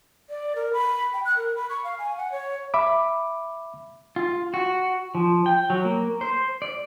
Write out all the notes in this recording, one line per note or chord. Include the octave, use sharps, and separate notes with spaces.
D5
A#4
B5
G5
F#6
A#4
B5
C#6
F5
G#5
F#5
C#5
E5 B5 D6
F4
F#4
F3
G5
F#3
A#3
C5
D5